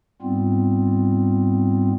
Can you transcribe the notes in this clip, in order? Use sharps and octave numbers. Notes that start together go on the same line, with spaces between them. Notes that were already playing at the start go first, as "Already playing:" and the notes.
G#2 G3 B3 C4 F4